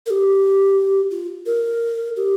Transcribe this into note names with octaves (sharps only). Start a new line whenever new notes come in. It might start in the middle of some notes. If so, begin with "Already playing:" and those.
A#4
G4
F4
A#4
G4